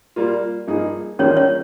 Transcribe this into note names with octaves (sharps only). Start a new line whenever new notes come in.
G3 A#3 F4
G2 F3 A#3 D#4 G#4
D#3 G3 A#3 C#4 F4 G#4 C#5
C#4 C#5